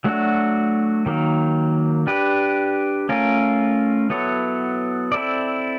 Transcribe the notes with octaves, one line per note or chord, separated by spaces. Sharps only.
F#3 A3 D4 F#4
D#3 F#3 A#3
D4 G4 B4
A3 C#4 F4 A#4
F#3 B3 E4 A4 C#5
C4 E4 A4 D5